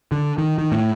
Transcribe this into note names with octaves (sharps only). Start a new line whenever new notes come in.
D3
D#3
D#3
A2